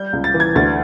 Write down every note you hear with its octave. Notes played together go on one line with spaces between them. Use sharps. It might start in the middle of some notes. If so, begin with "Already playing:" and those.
Already playing: G3 G6
C#2
A6
E3
G#6
D2 A6